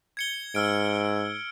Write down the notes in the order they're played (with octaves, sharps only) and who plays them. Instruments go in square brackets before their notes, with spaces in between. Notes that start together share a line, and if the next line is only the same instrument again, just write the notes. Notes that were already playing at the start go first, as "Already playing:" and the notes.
[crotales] G#6 C#7 G7
[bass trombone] G#2 [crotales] E6 F6 D7